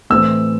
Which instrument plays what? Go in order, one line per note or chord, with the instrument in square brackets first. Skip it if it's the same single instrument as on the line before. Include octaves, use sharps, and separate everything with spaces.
[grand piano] A2 E3 A3 C4 E6